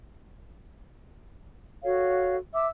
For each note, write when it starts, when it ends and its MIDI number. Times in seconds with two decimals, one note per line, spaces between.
1.83 2.37 66
1.83 2.37 69
1.83 2.37 73
1.83 2.37 77
2.54 2.68 76
2.54 2.68 86
2.54 2.68 88